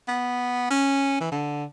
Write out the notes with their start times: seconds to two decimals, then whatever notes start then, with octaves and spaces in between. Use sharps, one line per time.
0.08 B3
0.71 C#4
1.21 E3
1.32 D3